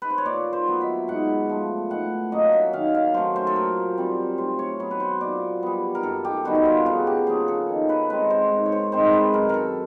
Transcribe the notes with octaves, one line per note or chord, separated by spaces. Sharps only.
B4
C5
C#5
A#2 D5
C5
F#3 B3
E5
G#2 F#5
F3 A3
A2 F#5
F#3 A#3 C#4 D#5
E5
D#3 F5
F5
F#3 A3 C#4 C5
C5
A4
A#2 A#4
G3 C4
A2 C5
C#5
F#3 B3 C#5
B4
C5
A#2 D5
G3 B3
A#4
F#2 A4
G4
D#3 G3 B3 F#4
F#4
F4
C#3 F#4
G4
F3 A#3 C#4 G#4
A4
D#3
B4
G#3 C4 B4
C5
G#2
C#5
C5
D#3 G#3 C4 C5
B4
F#2 A#4
A4 A#4